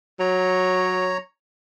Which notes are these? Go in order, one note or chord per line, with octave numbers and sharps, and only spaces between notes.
F#3 C#5 A#5